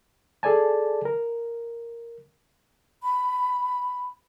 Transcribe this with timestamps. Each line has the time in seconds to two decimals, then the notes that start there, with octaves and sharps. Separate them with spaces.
0.43 G#4 A4 D5 G#5 A5
1.05 A#4
3.02 B5